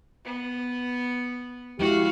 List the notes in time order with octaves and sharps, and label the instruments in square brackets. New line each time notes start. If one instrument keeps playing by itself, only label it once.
[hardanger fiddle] B3
[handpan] F3 G#3 E4 [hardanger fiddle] F#4 F5 [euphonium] G4